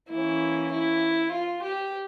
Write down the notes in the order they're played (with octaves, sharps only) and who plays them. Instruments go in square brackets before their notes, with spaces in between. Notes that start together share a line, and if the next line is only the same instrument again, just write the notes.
[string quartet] E3 A#3 C#4 E4
E4
F4
G4